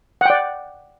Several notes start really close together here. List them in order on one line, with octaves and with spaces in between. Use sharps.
F#5 G5 D5